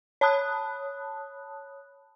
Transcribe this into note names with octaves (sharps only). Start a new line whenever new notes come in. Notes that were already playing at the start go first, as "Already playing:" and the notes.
C#5 A5 B5 D#6 F#6